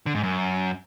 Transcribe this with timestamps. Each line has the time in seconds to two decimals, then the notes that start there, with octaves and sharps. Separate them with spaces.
0.06 D3
0.15 G#2
0.23 F#2